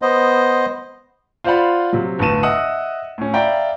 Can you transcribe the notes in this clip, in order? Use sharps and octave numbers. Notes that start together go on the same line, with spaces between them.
B3 C5 D#5
F4 C5 D5 F5 F#5 B5
C3 F#3
G1 D2 A2 A5 D#7 E7
D#5 E5 F#5 D#6 E6
A2 C#4
D5 E5 F5 G5 A#5 B5